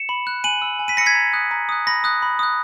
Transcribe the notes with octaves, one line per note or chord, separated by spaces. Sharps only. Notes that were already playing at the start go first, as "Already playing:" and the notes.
Already playing: C#7 E7
B5
F#6
G#5 D#7 F#7
B5 E6
G#5
B6 D#7
B5 E6 A#6 C#7
G#6 B6
A#5
D#6 F#6
A#5
D#6 F#6
B5 A#6
D#6 F#6
B5
D#6 F#6